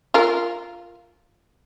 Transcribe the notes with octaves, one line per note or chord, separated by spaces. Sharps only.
F4 A#4